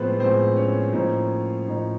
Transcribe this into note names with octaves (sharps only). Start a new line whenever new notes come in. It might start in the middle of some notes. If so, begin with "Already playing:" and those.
Already playing: A2 F3 G#3 B3 C4 B4 C5
A2 F3 G#3 C4 C5
C#4 C#5
A2 F3 A#3 D#4
A2 F3 A#3 D#4